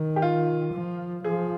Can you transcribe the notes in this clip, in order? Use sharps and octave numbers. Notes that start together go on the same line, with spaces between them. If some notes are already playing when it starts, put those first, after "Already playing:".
Already playing: D#3
G4
F4
F3
F3 G#4